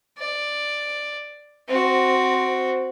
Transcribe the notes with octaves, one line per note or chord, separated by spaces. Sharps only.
D5
C4 F#4